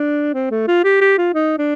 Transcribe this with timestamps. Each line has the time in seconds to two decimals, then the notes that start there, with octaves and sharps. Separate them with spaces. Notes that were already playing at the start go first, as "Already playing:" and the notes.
Already playing: D4
0.34 C4
0.51 A3
0.67 F4
0.84 G4
1.01 G4
1.18 F4
1.34 D#4
1.58 D4